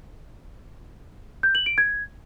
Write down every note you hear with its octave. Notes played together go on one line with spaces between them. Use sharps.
G6
F#7
D7
G#6